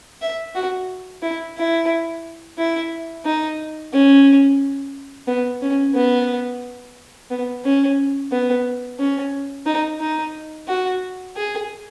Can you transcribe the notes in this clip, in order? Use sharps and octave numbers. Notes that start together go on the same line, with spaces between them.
E5
F#4
E4
E4
E4
D#4
C#4
B3
C#4
B3
B3
C#4
B3
C#4
D#4
D#4
F#4
G#4